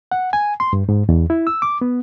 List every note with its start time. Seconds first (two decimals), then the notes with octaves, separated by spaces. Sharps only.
0.12 F#5
0.33 G#5
0.60 C6
0.73 G2
0.89 G#2
1.09 E2
1.30 E4
1.47 E6
1.62 D6
1.81 B3